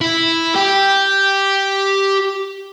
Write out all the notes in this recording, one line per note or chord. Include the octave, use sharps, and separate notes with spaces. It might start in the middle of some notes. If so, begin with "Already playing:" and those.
E4
G4